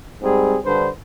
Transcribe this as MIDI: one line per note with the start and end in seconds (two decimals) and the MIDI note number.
0.22 0.55 44
0.22 0.55 55
0.22 0.55 60
0.22 0.55 68
0.63 0.87 43
0.63 0.87 50
0.63 0.87 71
0.63 0.87 72